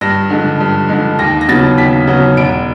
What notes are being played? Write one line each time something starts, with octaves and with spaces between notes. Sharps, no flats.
G2 A#6
D3 F3 G#3
G2
D3 F3 G#3
D#2 A#6
A#6
C#3 F#3 B3 A6
D#2 B6
C#3 F#3 B3
E1 D7